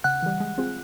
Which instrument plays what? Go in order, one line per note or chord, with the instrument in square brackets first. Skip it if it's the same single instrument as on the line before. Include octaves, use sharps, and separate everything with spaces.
[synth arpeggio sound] C#3 [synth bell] F#5 F#6
[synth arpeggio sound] E3 G3
G#3
C4 F4 G#4